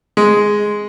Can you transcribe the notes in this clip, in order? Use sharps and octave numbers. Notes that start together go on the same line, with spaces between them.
G#3